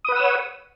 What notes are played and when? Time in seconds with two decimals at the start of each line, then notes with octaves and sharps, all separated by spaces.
0.05 D#6
0.08 B4
0.12 F#5
0.16 E6
0.20 C#5